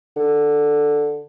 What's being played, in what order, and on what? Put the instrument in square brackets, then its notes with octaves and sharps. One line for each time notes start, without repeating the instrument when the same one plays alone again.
[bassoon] D3